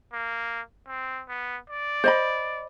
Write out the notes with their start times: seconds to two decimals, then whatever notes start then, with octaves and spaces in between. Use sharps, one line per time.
0.13 A#3
0.88 C4
1.29 B3
1.70 D5
2.04 C5 D#5 B5